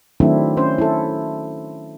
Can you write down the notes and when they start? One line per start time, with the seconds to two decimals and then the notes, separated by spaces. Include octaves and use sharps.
0.20 D#3 F#3 A3 C4 D4 E4
0.57 C#4 C5
0.78 E4 A4